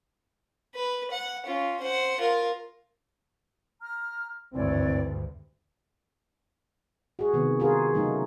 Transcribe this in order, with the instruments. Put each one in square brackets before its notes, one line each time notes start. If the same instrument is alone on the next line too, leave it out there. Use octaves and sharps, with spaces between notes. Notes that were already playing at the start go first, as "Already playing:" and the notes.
[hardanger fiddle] B4
F#5
C#4 F4
C5 F#5
F4 A#4
[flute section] A#5 F6
[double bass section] G#1 D2 G2 [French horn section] E3 C4 [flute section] C#5 D5
[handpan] F#4 G#4
C3 D#3 B3
F4 F#4 G#4 A#4
C#3 F#3 A3 D#4